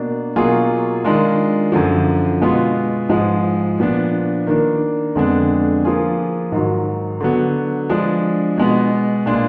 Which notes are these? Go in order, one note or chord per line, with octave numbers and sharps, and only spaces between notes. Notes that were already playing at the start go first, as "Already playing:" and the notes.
Already playing: B2 A#3 D4
B2 F#3 A#3 F4 G#4
D#3 G#3 D4 F4
F#2 D3 F3
B2 G#3 B3 F4
G#2 F3 G#3
A#2 F3 B3 D4
D#3 A#3 D4
F2 D3 G#3 B3 D4
F3 A#3 F4 G#4
G#2 D#3 F#3
D3 F#3 B3
F3 G#3 D4
B2 G#3 B3
A#2 G#3 D4 F4